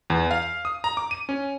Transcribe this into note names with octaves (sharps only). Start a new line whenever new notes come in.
E2
F5
D#6
A#5
D6
D#7
C#4